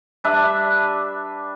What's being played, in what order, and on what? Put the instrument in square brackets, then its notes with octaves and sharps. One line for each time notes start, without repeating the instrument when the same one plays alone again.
[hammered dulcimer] G3 D4 B4 E5